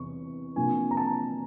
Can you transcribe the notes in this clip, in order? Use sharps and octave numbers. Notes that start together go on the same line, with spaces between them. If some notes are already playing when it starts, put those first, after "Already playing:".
Already playing: E2 C3 C#6
C3 F3 A#3 D4 G#5
A#5
A5